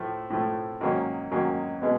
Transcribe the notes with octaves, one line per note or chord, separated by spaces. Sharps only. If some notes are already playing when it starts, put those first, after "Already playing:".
Already playing: A2 F3 A3
A2 F3 A3
G#2 D#3 F#3 A#3 C#4
G#2 D#3 F#3 A#3 C#4
B2 G#3